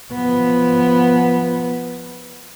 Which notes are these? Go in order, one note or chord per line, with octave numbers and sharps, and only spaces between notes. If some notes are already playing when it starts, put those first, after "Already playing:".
F3 B3